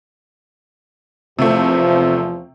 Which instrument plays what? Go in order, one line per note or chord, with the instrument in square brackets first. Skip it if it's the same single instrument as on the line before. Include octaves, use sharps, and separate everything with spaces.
[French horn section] E2 F3 [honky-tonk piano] C3 A3